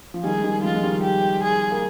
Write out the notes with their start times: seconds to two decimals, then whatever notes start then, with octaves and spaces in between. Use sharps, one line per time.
0.14 F3
0.24 D#3 G3 G#4
0.38 G#3
0.43 D#3 G3
0.63 F3 G#3 F4
0.74 G#3
0.83 D#3 G3
1.03 G4
1.43 G#4
1.72 A#3